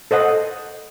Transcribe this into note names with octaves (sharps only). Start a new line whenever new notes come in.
A4 C5 D#5 F#5